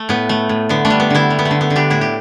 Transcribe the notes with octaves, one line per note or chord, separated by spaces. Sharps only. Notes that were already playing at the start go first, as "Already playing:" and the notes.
Already playing: A3
A2 B3
A3
A2
D3 B3
A3 D4
G3
B3
D3 B3 E4
G3
B3
A3
D3
B3
D3
D4 G4
A2 E4
G4